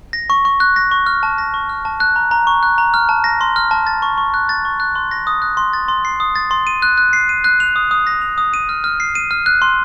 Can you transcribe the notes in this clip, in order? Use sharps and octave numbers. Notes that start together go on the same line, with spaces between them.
A#6
C#6
C#6
F#6
A#6
C#6
F6
A5
A#6
C#6
F6
A5
F#6
A#5
A#5
C#6
F#6
A#5
F6
A5
A#6
C6
F6
A5
A6
C#6
C#6
F#6
A6
C#6
F#6
C6
A#6
D#6
F#6
C6
A6
C6
C7
D#6
A6
C6
D#7
F#6
F#6
C7
D#7
F#6
F7
D#6
D#6
A#6
F7
D#6
D#7
F6
F6
C7
D#7
F6
F#6
C6